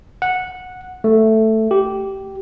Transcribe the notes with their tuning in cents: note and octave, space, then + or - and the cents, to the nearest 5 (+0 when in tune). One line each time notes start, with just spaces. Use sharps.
F#5 -10
A3 +5
G4 -15